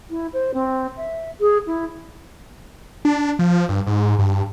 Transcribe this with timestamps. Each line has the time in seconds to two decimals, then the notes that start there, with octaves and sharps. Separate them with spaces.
0.10 E4
0.33 C5
0.53 C4
0.96 E5
1.40 G#4
1.66 E4
3.05 D4
3.39 F3
3.69 G2
3.87 G#2
4.19 G2